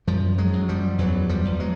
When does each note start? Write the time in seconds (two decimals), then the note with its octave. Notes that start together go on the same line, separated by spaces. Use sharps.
0.07 F#2 F3 G3
0.38 F#3 G#3
0.53 F#2
0.69 F3 G3
0.98 E2 E3 F#3
1.29 F3 G3
1.45 E2
1.60 F#3 G#3